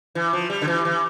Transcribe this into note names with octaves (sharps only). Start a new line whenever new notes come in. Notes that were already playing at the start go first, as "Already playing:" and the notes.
E3
F3
G3
D3
E3
E3